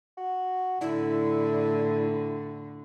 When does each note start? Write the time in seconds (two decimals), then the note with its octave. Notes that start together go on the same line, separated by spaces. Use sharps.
0.17 F#4
0.81 A2 D3 D4 E4